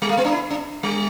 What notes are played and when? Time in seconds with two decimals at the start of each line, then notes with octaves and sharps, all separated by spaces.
0.02 G3
0.09 A3
0.17 B3
0.25 D4
0.33 E4
0.50 D4
0.83 G3